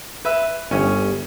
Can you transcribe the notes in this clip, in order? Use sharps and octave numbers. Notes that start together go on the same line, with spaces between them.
B4 E5
G1 C#4